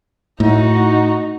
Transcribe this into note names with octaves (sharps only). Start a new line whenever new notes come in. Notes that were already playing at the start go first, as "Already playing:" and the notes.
A2 D#4 F#4